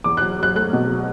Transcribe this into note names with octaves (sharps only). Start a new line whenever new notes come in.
E2 D6
F#3 F#6
F#3 F#6
A3 F#6
B2
F#3